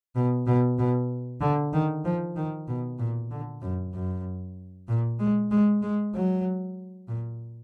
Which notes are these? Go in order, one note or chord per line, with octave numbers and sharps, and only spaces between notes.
B2
B2
B2
D3
D#3
F3
D#3
B2
A#2
D3
F#2
F#2
A#2
G#3
G#3
G#3
F#3
A#2